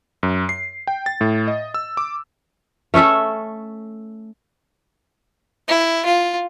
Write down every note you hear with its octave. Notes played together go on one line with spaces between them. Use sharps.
F#2
C7
G5
A6
A2
D#5
E6
D6
A3 C#4 A4 E5
E4
F4